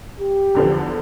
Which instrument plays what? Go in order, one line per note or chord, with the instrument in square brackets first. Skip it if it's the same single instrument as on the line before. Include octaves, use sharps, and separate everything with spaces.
[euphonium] G4
[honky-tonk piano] E2 D3 F3